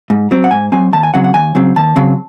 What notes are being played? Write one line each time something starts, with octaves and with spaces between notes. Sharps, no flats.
G#2
F#3 C4
F#5
G#2 G#5
F#3 C4 G#5
D#2 A5
G#5
C#3 F#3 C4 F#5
F#5
D#2 G#5
C#3 F#3 C4
D#2 A5
C#3 F#3 C4